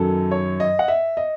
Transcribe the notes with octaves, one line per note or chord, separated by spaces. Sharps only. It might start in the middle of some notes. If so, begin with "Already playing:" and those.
Already playing: F#2 D#3 F#3 A4
C#5
D#5
F#5
E5
D#5